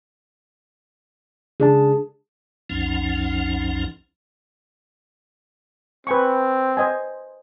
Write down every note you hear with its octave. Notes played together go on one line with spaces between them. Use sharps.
C#3 D4 G#4 A5
B1 F2 F3 C#4 D#4 F#5
C4 B4 G#5 C#6
C5 D#5 G#5